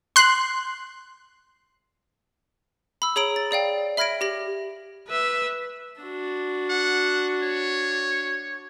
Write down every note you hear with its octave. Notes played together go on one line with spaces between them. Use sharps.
C6 F#6
B5 E6
G#4 C#5 A#5 B5 D7
A6
G#4 D5 F5 G5
E5 B5 F6 G#6 A#6 D7
G4 A#6 F#7
B4 E5
D4 F#4
F#5
C#5